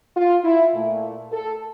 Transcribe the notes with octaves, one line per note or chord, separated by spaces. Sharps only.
F4
E4
A#2 A3
A4